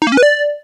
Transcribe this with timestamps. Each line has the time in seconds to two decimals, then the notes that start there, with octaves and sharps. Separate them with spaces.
0.02 D#4
0.07 A#3
0.12 C#4
0.17 B4
0.23 D5